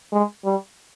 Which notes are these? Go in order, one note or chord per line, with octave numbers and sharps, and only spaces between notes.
G#3
G3